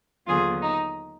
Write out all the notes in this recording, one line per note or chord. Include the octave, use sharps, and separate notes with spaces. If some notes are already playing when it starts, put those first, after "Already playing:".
D#2 D3 F#3 B3 F4 G#4
D#4